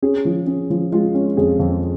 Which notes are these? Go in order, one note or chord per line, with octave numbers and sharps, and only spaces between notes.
C#4 G#4
F3
C#4
F3
G#3 F4
C#4
F2 G#4
F2